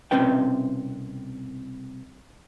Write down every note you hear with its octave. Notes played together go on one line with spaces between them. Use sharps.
C2 B2 C4 C#4 B4 G5